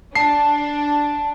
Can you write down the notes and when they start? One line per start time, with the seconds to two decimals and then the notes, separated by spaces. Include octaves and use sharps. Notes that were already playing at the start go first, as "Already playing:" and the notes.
0.15 D4 A5 C7